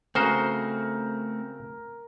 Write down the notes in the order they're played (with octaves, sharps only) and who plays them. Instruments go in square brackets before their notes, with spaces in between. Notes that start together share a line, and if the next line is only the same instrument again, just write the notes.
[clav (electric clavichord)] C#3 F#4 C5 [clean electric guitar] A3 C4 [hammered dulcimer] A#4